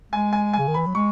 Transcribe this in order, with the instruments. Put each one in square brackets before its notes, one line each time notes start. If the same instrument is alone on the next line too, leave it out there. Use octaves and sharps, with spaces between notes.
[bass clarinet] G#3 [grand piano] G#5
[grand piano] G#5
G#5
[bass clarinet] C#3
D#3
[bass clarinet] E3 [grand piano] B5
[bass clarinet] F#3
[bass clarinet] G#3 [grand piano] C#6